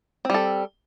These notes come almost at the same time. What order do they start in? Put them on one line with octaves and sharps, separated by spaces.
C4 G3 A4